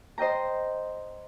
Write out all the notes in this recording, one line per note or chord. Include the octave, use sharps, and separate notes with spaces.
C5 D#5 G5 A#5